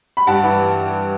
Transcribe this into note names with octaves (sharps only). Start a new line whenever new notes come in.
B5
G2 F#5 A5
E3